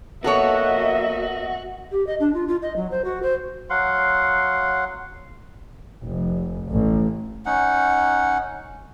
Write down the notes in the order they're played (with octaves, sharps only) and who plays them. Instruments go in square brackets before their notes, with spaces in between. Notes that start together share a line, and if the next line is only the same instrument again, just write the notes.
[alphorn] A#3 [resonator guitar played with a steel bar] B3 A4 C#5 [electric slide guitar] F#4 [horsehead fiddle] D#5 E5
[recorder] G4
D#5
D4
F4
F4
D#5
F#3
C5
F#4
C5
[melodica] F#3 F5 F#5 C6
[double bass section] F1
A1
[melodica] C#4 D#4 F#5